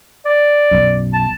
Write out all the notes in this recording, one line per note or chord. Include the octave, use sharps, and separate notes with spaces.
D5
B1 F#2
A5